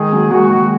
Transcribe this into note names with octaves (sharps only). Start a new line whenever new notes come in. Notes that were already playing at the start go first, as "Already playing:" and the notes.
Already playing: D#3 G#3 G#4
F#3 A#3
D#3 G#3 F#4
D#3